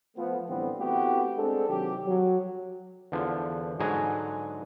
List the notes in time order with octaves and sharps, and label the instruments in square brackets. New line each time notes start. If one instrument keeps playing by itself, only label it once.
[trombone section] F3 A3 B3
A2 D3 E3 G3 B3 C4
A3 B3 C4 E4 F#4 G4
G#3 C4 D4 A4
C3 D#3 F#3 G4
F#3
[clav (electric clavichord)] E2 D3 F3
G#2 D3 F#3 G#4 G#5 A#5